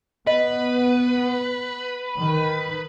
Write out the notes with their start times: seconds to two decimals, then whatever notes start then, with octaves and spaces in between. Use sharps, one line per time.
0.27 B3 B4 D#5
2.18 D#3